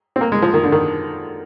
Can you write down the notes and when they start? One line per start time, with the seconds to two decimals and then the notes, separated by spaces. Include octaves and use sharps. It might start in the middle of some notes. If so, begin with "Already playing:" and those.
0.16 C4
0.21 A#3
0.32 G#3
0.42 F3
0.54 D#3
0.64 D3
0.72 D#3